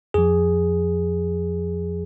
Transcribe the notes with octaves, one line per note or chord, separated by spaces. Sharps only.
F2 F3 G#4